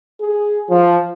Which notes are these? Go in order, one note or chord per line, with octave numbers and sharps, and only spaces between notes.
G#4
F3